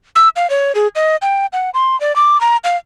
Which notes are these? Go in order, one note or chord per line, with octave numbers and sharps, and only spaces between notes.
E6
F5
C#5
G#4
D#5
G5
F#5
C6
D5
D6
A#5
F5